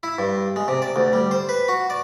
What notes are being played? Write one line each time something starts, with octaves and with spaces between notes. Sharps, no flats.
E4
G2
G#3
C3
D5
D2
G3
C5
B4
F#4
D5